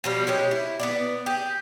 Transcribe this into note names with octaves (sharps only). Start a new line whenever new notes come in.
B2 F3 G3
G#3 C#4 G4
E4
B3 D4 D5
G4 G#4